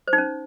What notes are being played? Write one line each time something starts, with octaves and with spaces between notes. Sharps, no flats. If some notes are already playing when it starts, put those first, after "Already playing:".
C5
D#4
C#4